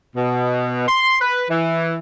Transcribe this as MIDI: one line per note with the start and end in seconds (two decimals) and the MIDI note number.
0.16 0.87 47
0.87 1.17 84
1.20 1.44 71
1.49 1.96 52